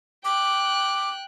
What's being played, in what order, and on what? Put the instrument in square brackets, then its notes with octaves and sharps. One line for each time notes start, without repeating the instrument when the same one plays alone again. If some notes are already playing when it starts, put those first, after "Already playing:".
[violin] G5 F#6 [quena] D6